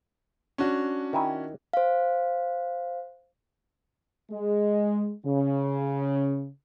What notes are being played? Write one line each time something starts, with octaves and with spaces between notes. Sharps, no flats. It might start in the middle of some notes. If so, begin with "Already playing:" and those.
C#4 D4 F#4
D#3 E4 G#5
C5 F5
G#3
C#3